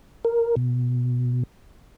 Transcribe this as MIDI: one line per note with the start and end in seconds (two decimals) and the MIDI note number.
0.25 0.55 70
0.56 1.43 47